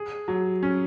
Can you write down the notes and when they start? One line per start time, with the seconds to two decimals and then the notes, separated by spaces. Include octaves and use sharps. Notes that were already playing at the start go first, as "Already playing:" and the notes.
Already playing: G#4
0.28 F#3
0.63 C#4